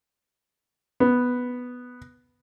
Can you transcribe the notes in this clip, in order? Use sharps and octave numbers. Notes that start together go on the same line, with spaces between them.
B3